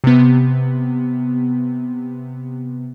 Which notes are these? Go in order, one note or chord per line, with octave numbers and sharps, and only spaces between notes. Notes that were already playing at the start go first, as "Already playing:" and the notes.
C3 B3